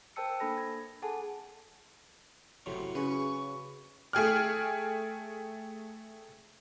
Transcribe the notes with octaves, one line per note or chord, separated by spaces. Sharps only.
A#4 C5 G5 A5 E6 C#7
A#3 D4 A4 B5 A#6
G#6
G#4 A4 F#5 G#5 A5
F#1 A2 C3 F#3
C#3 C#4 F#4 G#4 B4 C#6
A3 G#4 G5 F6